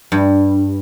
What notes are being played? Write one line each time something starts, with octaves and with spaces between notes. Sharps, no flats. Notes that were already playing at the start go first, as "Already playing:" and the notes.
G2